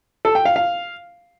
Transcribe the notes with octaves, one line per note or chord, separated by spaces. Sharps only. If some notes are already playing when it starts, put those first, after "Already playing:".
A4
G5
F5
F5